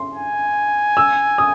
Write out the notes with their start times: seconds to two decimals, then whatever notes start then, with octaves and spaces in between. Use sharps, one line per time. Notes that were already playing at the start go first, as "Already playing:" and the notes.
Already playing: C6
0.14 G#5
0.97 E6
1.38 D#6